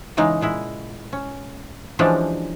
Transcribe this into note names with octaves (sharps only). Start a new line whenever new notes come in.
C#3 E3 G#3 D#4
A#2 G#3 E4
C#4
E3 F3 G#3 C#4 D4 G4